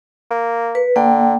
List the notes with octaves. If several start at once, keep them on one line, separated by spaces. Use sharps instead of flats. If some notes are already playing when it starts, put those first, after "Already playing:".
A#3
B4
D3 A#3 G5